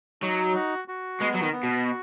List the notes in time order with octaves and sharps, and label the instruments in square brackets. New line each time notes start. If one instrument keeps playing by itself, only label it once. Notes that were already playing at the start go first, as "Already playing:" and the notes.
[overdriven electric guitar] F#3 [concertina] D#4
[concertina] F#4
F#4
[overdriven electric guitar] G#3 [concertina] B3
[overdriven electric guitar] F#3
D#3
[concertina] B3
[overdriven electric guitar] B2
[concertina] F#4